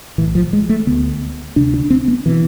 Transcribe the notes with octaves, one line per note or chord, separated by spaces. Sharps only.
B1 A2 E3
F3
G#3
A3
D2 D3 B3
D2 C3 D4
D4
C4
B3
B2 E3